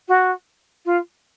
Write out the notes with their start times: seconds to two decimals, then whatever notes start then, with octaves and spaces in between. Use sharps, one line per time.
0.08 F#4
0.85 F4